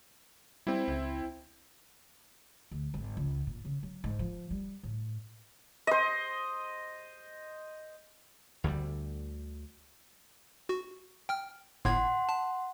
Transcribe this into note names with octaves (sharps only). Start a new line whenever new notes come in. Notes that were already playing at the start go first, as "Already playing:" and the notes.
G3 C4 E4
C#2
D2
G#1
C#2
A#2
C#3
F#3
G#2
F3
G3
A2
C5 D#5
D2 D3 F3 G3
F#4
G5 F6
G1 A2 F#5 C6 G#6
A5